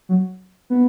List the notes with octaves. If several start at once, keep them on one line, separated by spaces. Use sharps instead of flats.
F#3
B3